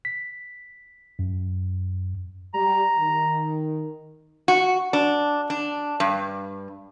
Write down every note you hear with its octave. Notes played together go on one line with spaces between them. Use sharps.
B6
F#2
G3 A#5
D#3
F#4
D4
D4
G2